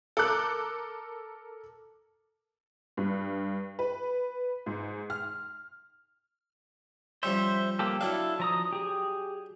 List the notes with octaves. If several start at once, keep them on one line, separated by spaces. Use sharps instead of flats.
A4 A#4 D6 F#6
G2
B4
G#2
F6
F3 G3 C#4 C5 E5
A#3 G4 A4
F#3 D4 E4 A4 F5
F3 A#5 D#6
G4 G#4